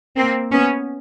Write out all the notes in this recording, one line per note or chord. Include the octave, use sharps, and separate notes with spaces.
A#3 C4
B3 C#4